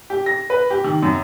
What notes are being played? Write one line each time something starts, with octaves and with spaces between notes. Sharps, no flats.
G4
A#6
B4
G4
D#3
F#2